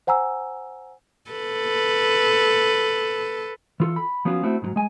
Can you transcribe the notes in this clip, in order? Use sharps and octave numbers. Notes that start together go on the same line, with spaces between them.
C5 F#5 G#5 A#5 E6
A4 B4
E3 F4 A4
B5
F3 F#3 B3 C#4 F4 F#4
A3 C4 E4 F#4
G#2 D3 F#3
G#3 G#5